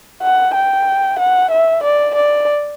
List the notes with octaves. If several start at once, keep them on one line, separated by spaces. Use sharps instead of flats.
F#5
G5
F#5
E5
D5
D5